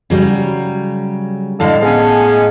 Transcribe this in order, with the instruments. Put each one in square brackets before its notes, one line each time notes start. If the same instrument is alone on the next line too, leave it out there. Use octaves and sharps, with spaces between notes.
[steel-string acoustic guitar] C#3 F#3 G3
[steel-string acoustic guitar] A2 F5 A5 [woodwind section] D3 G#3
[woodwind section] G#3 B3 C#4